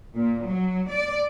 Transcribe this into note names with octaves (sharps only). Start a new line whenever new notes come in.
A#2
F#3
D5